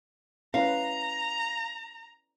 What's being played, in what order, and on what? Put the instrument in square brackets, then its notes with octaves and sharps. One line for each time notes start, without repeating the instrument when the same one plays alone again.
[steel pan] C#4 E4 B4 [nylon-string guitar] F5 [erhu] A#5